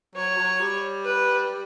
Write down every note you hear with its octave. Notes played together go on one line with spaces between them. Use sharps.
F#3 C#5
F#3
G3
B4